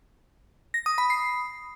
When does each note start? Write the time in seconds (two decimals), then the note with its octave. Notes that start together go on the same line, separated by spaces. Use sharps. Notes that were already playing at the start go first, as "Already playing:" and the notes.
0.74 A#6
0.86 D#6
0.98 B5
1.10 C7